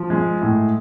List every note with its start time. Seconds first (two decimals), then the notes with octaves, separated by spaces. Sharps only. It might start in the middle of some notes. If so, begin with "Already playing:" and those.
Already playing: F3
0.10 G#3
0.41 A2